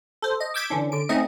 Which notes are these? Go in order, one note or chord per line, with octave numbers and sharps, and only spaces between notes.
A4 C5
D#5
D6 E6 G6 G#6 B6 D7
D3 E3 C#4 D4
D3 D7
A3 C4 C#4 D#4 D#5